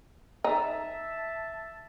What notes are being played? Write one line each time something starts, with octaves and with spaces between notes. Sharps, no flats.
D#4 E5 A5